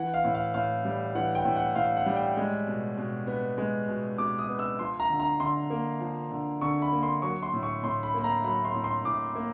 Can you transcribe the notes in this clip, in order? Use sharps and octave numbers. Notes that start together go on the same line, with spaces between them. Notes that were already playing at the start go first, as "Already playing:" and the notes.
Already playing: E3 F#5
F5
A2
F5
A2 F5
G3
E3 F#5
G5
A2
F#5
A2 F5
F#5
G3
G5
G#3
B2
B2
B3
G#3
B2
B2 D6
D#6
B3
E6
F3 C6
A#5
D3
A#5
D3 C6
A#3
F3
D3
D3 C#6
B5
A#3
C6
F#3 C#6
C6
A2
C#6
A2 C6
B5
A#3 B5
A#5
F#3 B5
C6
A2
C6
A2 D6
A#3